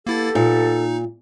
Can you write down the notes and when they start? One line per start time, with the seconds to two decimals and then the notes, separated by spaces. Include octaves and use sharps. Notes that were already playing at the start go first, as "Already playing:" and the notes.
0.07 A#3 B3 E4 G4 A4 A6
0.35 A#2 D#4